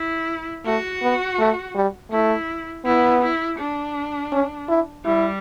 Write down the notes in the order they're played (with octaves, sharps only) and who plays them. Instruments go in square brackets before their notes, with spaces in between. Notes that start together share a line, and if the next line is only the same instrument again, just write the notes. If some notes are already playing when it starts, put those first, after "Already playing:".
Already playing: [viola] E4
[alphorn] A3 [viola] F#4
[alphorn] B3
A3
G3
[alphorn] A3 [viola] E4
[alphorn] B3 [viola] E4
[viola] E4
D4
[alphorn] C#4
E4
[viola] G3 [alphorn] E4